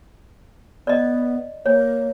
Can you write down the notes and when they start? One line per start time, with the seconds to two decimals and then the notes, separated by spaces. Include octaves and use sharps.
0.87 B3 D5 D#5
1.66 A#3 C#5